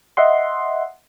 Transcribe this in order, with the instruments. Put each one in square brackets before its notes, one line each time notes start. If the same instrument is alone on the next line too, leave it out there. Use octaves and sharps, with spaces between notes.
[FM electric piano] D#5 E5 F#5 C6